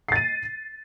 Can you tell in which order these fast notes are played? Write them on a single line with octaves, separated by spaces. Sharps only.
C7 A6 D#7